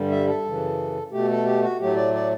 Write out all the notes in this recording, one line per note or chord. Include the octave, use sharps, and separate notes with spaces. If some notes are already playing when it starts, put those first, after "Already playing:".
Already playing: G2 D3 G3
E5
A4
F#2 C#3 E3
B2 A3 G4
A4
G4
F#4
A2 F#3 A3 G4
D5
D5